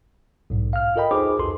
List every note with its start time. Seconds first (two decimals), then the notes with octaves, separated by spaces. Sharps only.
0.50 B1 G#2
0.73 F5 F6
0.96 F4 A4 A#4 D#5 G5 B5
1.11 D#4 F#4 G#4 B4 C5 D6
1.39 C2 F2 A4 C6